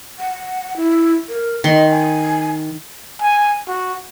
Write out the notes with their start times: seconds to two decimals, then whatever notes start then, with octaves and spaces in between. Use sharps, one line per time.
0.19 F#5
0.76 E4
1.29 A#4
1.64 D#3 D#5 C6
1.91 G#5
3.21 G#5
3.68 F#4